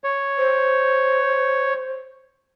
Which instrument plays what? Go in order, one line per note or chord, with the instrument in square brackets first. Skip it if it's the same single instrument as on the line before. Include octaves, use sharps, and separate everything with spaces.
[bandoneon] C#5
[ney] C5